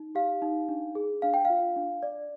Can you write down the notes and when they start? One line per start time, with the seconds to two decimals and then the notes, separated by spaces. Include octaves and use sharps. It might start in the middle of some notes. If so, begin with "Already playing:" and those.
Already playing: D#4
0.15 G4 F5
0.42 D#4
0.69 D4
0.95 G#4
1.22 D4 F5
1.34 G5
1.45 F4 F5
1.76 D4
2.03 D5